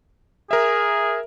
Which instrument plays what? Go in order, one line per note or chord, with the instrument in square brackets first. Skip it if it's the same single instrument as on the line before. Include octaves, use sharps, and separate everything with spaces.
[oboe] G#4 [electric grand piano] A#4 E5